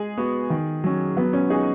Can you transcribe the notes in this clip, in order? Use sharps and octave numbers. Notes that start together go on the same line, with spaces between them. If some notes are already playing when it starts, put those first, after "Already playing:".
Already playing: G#3 G#4
B3 F#4
D#3
F#3 C#4
F#3 B3
C#4
D#4 F#4 G#4